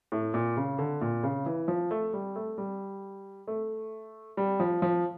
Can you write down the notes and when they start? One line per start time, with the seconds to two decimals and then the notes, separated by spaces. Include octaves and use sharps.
0.12 A2
0.34 A#2
0.57 C#3
0.79 D3
1.01 A#2
1.23 C#3
1.46 E3
1.68 F3
1.91 A3
2.13 G3
2.36 A3
2.58 G3
3.47 A3
4.37 G3
4.60 F3
4.82 F3